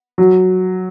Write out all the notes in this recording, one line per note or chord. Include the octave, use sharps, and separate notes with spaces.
F#3